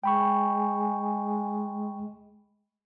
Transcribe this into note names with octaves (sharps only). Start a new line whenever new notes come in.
G#3 G5 B5 C#6